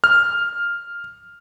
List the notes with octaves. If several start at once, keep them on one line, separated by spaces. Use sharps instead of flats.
F6